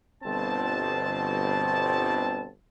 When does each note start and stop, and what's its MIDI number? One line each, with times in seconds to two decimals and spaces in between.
0.23 2.47 31
0.23 2.47 47
0.23 2.47 60
0.23 2.47 81